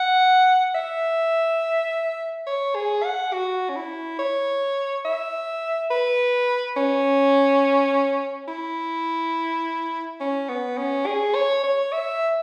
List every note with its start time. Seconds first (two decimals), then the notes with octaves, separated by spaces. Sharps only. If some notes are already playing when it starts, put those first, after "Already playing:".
Already playing: F#5
0.75 E5
2.47 C#5
2.75 G#4
3.04 F#5
3.33 F#4
3.70 C#4
3.76 E4
4.19 C#5
5.05 E5
5.91 B4
6.77 C#4
8.48 E4
10.20 C#4
10.49 B3
10.77 C#4
11.06 G#4
11.35 C#5
11.64 C#5
11.92 E5